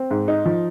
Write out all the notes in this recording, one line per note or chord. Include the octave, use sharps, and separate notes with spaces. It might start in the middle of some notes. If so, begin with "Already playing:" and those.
Already playing: C4
G#2
D#4
F3